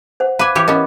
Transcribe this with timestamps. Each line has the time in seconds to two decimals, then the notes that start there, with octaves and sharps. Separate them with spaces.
0.20 C5 F#5
0.39 B4 F5 G#5 D6
0.55 E3 G4 C#5
0.68 B3 C#4 A#4 D#5